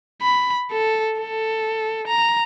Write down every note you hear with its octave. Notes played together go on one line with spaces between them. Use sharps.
B5
A4
A4
A#5